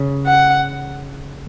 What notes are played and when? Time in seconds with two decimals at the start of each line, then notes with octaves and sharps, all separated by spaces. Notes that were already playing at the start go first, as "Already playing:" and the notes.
Already playing: C#3
0.27 F#5